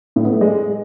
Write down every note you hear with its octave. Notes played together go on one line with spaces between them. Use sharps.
A2
B3
A3
G#3